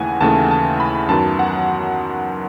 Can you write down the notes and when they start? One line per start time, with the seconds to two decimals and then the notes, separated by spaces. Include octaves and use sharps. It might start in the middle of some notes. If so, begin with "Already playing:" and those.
Already playing: D#2 C#3 E3 A3 F#5 G#5
0.21 D#2 C#3 E3 A3 A5
0.51 A5
0.80 B5
1.09 F#2 D#3 F#3 B3 A5
1.39 F#5